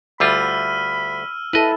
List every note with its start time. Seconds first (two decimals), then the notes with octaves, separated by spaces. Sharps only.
0.20 D2 G3 F4 B5 E6 F6 D#7
1.53 E4 A4 B4 D#5